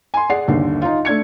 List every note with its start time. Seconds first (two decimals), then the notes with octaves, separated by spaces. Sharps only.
0.14 G#5 C6
0.30 G#4 D5 F#5 C7
0.48 G1 D#2 D3
0.82 D#4 F4
1.05 A3 D4 G#6 C#7